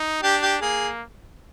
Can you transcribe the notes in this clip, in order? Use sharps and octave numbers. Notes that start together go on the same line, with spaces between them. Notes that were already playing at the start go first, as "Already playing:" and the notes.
Already playing: D#4
D4 G4
G4
A#3 G#4